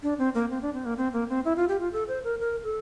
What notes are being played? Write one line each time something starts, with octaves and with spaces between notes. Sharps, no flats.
D4
C4
A#3
C4
D4
C4
A#3
C4
A#3
C4
E4
F4
G4
F4
A4
C5
A#4
A#4
A4